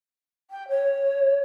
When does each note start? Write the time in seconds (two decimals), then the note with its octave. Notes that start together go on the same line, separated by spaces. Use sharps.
0.50 G5
0.68 C#5